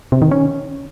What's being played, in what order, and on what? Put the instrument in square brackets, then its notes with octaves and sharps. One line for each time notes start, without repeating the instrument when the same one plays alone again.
[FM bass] C3
D#3
C#4